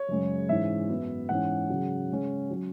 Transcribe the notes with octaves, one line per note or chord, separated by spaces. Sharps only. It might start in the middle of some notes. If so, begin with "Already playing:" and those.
Already playing: C#5
F#2 C#3 G#3 C#4
G#2 E3 C#4 E5
F#2 F#3 B3
G#2 E3 C#4 F#5
C#3 F#3 C#4
C#3 G#3 C#4
F#3 C#4